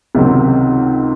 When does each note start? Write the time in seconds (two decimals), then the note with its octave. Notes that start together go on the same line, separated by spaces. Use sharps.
0.15 C#2 C3 D#3 F#3 C4